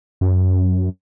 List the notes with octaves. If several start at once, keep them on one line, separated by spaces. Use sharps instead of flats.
F#2